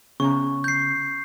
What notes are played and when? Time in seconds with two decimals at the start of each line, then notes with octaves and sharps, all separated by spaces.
0.20 C#3 B3 C#4 A#5 C#6
0.64 G6 C7